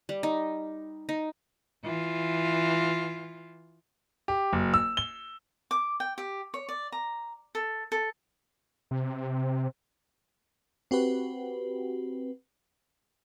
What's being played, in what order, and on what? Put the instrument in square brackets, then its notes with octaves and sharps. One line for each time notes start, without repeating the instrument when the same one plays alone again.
[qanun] G3
D#4
D#4
[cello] E3 F4
[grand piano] G4
F#1
E6
G7
[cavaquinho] D6
G5
G4
C#5
D5
A#5
A4
A4
[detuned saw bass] C3
[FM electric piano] C4 F#4 G4 B4